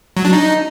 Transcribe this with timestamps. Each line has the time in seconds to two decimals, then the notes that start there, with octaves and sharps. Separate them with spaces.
0.17 F#3
0.25 D4
0.33 D#4